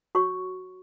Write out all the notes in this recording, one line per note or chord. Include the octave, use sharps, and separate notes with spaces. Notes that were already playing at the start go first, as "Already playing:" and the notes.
F#4 C#5 C#6